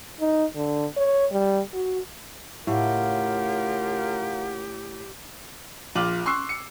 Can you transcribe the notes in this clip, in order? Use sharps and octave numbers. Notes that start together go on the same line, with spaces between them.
D#4
D3
C#5
G3
F#4
A2 C#3 F4 G4 A#4 F5 F#5
A#1 F4 D6 F#7
C6 C#6 E6 F#6 C7
C#7